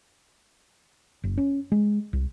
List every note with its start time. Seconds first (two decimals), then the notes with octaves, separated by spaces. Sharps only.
1.24 F#1
1.38 C#4
1.72 G#3
2.13 C2